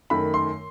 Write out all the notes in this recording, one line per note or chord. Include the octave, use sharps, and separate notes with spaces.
F#2 D#3 A3 B5
C6